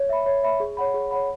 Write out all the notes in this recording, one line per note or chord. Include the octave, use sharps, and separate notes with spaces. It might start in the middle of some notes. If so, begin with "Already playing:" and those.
Already playing: C#5
E5 B5
C#5
E5 B5
G#4
C#5 F#5 B5
G#4
C#5 F#5 B5